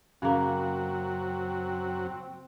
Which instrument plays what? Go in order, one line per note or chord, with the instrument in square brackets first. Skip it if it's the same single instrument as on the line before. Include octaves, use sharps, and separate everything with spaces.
[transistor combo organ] F#2 F#3 F#4 [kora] C#3 A#3 [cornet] C4